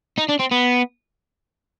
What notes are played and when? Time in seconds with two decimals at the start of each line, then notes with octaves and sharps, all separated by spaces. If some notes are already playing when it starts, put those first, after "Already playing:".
0.18 D#4
0.29 D4
0.39 C4
0.51 B3